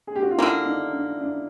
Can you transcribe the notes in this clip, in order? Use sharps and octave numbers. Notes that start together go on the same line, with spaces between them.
G#4
G4
F#4
F4
D3 G3 A#3 E4
D#4
D4
D4